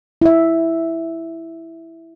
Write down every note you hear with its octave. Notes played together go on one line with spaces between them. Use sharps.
E4 E5